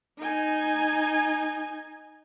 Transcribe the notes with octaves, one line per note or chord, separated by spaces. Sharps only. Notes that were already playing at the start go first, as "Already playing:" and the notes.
D#4 G#5